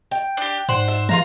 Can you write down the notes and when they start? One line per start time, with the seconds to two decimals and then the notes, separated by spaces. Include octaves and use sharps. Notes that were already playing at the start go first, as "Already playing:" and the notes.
0.11 G5
0.37 D4 G4
0.69 G#2 C5 D5 F#5
0.88 E5
1.09 E3 F4 F5 A#5